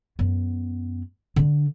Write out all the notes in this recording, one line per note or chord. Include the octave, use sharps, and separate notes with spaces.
F#2 B3
D3 D4